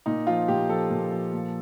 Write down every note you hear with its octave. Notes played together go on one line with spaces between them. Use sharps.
A#2 D#4
F3 F4
A#2 G4
F3 A4
A#2
F3
A#2